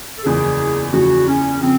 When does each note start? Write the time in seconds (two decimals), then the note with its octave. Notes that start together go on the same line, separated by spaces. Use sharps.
0.18 A4
0.23 F#1 E2 C#3 F3 G#4
0.93 F#1 E2 C#3 F3 F#4
1.27 C#4
1.61 C#3 F3 C4